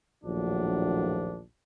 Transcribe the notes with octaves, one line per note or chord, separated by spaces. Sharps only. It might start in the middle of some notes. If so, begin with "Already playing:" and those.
A#1 D#2 A2 F3 F#3 D4